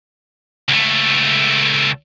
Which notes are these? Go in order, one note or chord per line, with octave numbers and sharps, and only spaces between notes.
C#2 A3